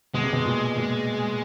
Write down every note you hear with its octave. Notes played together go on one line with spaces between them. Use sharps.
B2 G#3
C3
B2
A#2
A#2